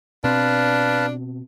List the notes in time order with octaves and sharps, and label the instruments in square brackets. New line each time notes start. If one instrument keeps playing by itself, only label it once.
[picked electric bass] B2 C4 [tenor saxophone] D4 [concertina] B4 F5 A5